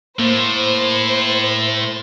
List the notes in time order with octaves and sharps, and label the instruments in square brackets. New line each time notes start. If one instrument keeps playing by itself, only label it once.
[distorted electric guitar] A2 [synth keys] A#3 [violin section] C5